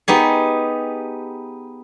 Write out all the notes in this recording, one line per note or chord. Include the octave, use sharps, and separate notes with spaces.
B3 D#4 G4 G#4